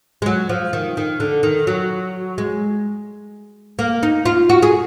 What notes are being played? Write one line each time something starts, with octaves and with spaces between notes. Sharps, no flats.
G#3
F#3
F3
D#3
D#3
D3
D#3
F#3
G#3
A#3
D#4
F4
F#4
G#4